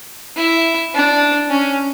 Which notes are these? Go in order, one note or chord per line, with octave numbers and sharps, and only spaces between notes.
E4
D4
C#4